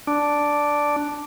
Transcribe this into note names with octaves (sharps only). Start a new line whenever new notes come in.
D4